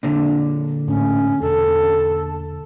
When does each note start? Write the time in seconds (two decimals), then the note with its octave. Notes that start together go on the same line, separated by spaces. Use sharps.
0.03 A#2 D3
0.88 A2 C#4
1.42 E1 A4